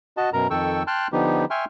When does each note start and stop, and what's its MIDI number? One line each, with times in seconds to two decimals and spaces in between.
0.17 0.30 66
0.17 0.30 75
0.17 0.30 81
0.33 0.47 42
0.33 0.47 47
0.33 0.47 70
0.33 0.47 82
0.50 0.83 41
0.50 0.83 51
0.50 0.83 69
0.50 0.83 79
0.50 0.83 85
0.50 0.83 88
0.87 1.07 79
0.87 1.07 81
0.87 1.07 84
0.87 1.07 89
0.87 1.07 90
1.12 1.45 50
1.12 1.45 53
1.12 1.45 59
1.12 1.45 63
1.12 1.45 67
1.50 1.65 76
1.50 1.65 79
1.50 1.65 80
1.50 1.65 84
1.50 1.65 85
1.50 1.65 89